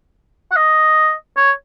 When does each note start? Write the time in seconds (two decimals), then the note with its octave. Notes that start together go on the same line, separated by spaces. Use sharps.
0.52 F#5
0.56 D#5
1.37 C#5